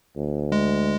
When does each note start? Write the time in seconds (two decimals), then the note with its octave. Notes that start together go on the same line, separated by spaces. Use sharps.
0.17 D2
0.52 G#3